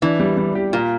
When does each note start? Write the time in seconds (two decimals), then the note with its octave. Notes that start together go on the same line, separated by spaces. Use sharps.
0.02 E3 D4
0.19 G3
0.37 G3
0.55 G4
0.73 A#2 F4